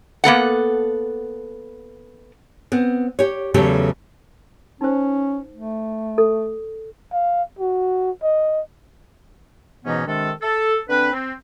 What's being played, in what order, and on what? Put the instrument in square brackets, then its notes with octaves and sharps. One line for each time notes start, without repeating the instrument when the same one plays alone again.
[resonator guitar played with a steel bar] A#3 B3 A4 F#5
[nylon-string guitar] B3 C4
G4 C#5
E2 C#3 F#3 A3 G4 A4
[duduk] C#4 [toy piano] D#4 C5
[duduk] A3
[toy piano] A4
[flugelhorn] F5
F#4
D#5
[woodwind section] G#2 B2 E3 B3 C#4 D#4
C3 D#3 G#3 D4 A4
A4
D3 C4 D4 B4
C4